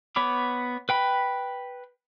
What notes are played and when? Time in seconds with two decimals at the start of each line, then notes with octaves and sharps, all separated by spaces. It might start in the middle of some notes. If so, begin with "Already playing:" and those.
0.16 B3 C#5 B5 D6
0.89 B4 G5 B5